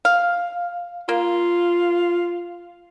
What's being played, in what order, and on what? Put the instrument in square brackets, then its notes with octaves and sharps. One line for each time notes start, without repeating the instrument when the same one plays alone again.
[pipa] F5
[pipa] A#3 [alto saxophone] F4